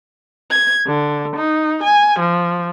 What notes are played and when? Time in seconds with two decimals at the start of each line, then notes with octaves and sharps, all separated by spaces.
0.50 G#6
0.87 D3
1.37 D#4
1.83 G#5
2.20 F3